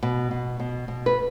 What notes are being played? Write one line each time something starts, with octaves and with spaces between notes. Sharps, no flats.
B2
B2
B2
B2
B4